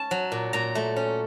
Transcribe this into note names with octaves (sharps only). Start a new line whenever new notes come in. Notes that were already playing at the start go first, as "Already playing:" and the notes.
Already playing: C#4 A5
F#3
A#2
A#2 A#5
A3
C#4